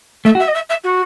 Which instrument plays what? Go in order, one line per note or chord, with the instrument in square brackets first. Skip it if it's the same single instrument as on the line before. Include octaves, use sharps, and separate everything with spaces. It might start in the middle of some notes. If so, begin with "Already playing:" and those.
[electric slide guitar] A3 [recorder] E5
[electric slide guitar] F#4
[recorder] E5
D#5
E5
E5
F#4